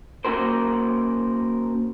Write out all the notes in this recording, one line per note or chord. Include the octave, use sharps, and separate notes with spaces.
A#3 C#4 F#4 A#4 C5